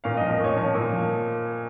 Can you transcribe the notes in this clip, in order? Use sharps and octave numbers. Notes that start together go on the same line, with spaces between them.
A#2 F5
D#5
F3
D#5
A#2 C#5
F3 C#5
A#2
F3